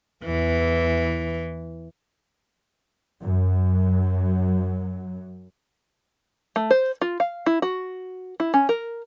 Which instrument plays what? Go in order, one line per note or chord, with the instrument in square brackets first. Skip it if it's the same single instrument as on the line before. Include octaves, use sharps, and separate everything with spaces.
[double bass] E2 [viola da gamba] E3
[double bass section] F#2 F#3
[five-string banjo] A3
C5
F4
F5
E4
F#4
E4
C#4
A#4